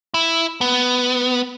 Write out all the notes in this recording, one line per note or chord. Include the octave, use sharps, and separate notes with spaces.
E4
B3